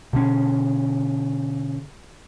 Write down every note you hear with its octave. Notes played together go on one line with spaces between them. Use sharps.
B2 D3 C#4